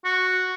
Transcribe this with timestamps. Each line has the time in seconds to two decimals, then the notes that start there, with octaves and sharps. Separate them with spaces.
0.05 F#4